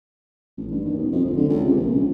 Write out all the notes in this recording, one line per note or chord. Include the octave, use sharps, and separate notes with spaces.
A1
G2
D#2
B2
F2
D1
D3
C#2
C3
A#1
C#2